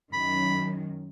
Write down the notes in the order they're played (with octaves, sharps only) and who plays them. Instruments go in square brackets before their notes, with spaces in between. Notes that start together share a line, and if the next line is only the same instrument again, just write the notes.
[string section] F#2 D#3 [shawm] B5